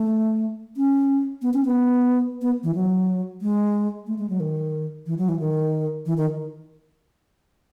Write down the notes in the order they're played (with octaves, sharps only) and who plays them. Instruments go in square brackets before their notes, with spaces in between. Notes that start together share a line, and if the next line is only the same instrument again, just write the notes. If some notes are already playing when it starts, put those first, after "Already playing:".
Already playing: [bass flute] A3
C#4
B3
C#4
B3
B3
E3
F#3
G#3
A3
G#3
F#3
D#3
E3
F#3
E3
D#3
E3
D#3